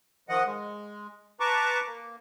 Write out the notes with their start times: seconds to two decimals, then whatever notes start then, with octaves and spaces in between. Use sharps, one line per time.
0.29 D#3 F3 D#5 F#5
0.46 G#3
1.40 B4 A5 A#5 C#6 D6
1.86 A#3